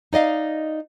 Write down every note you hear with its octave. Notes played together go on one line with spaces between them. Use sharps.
D#4 D5 D#5 F5